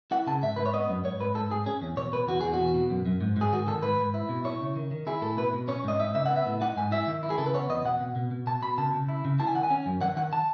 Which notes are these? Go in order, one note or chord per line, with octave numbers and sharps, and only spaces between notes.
E4 F#5
C#3 A5
G#2 E5
G#2 B4
C#5
B3 D#5
F#2
G#2 C#5
G#2 B4
G#2 A4
G#2 G#4
C#4 G#4
E2
B2 C#5
B2 B4
E2 F#4
E2 G#4
F#4
B2
B2
F#2
F#2
G#2
G#2 G#4
D#3 F#4
D#3 A4
G#2 B4
G#2
E4
B2
E4 C#5
C#3
D#3
D#3
E4 G#4
A2 A4
B2 B4
B2
C#4 C#5
G#2 D#5
D#4 E5
C#3 E5
B3 F#5
E5
A2
D#4 F#5
G#2 G#5
E4 E5
D#3
E4
G#4
C#3 A4
B4
B3 C#5
E2 D#5
B2 F#5
B2
B2
B2
B2 A5
B2 B5
C#3 A5
C#3
E4
C#3
E4 A5
G#5
D#3 F#5
G#5
C#4
F#2
D#3 F#5
D#3 F#5
A5